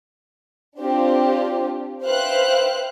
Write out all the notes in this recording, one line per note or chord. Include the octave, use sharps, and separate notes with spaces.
C4 D4 F4 G4
B4 C5 E5 F5 G5 F#6